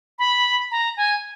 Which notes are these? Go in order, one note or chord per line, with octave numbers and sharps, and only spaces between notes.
B5
A#5
G#5